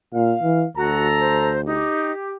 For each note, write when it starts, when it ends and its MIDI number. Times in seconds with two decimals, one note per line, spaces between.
0.14 0.35 46
0.14 0.65 77
0.43 0.65 52
0.77 1.87 38
0.77 1.07 66
0.77 1.53 69
0.77 1.53 82
1.19 1.61 72
1.66 2.12 63
1.66 2.36 67